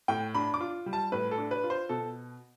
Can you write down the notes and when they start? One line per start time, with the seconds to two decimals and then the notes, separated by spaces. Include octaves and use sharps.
0.08 A2 G5
0.35 D4 B5
0.54 D6
0.61 F4
0.86 G3
0.93 A5
1.12 A2 B4
1.31 A4
1.38 D4
1.51 B4
1.64 F4
1.70 C5
1.89 B2 A4